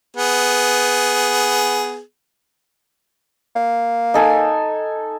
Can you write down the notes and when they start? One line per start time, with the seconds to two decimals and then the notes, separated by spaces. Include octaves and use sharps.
0.17 B3 G#4
3.56 A#3
4.14 D#4 A4 G#5